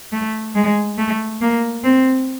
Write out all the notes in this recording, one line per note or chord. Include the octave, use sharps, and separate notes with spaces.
A3
G#3
A3
A#3
C4